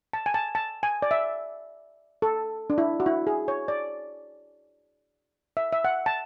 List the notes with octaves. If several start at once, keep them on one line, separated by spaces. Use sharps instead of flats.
A5
G#5
A5
A5
G#5
D5
E5
A4
D4
E4
F#4
E4
G#4
C#5
D5
E5
E5
F#5
A5